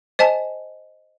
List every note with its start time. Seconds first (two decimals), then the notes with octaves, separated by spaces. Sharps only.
0.19 C5 D#5 G#5 A5